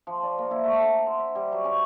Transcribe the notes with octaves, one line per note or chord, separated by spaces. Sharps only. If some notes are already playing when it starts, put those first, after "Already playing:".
F3
D5
A#3
E4
A3
F#5
A#5
C5
E5
G3
F#3
C#4